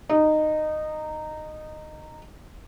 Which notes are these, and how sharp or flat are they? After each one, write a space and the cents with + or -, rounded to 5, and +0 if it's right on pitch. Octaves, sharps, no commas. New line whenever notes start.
D#4 -15